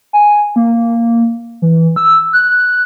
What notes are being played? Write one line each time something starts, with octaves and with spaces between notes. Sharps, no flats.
G#5
A#3
E3
E6
F#6